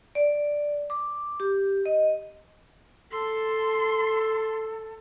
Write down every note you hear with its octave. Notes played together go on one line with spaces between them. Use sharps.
D5
D6
G4
D#5
A4 C6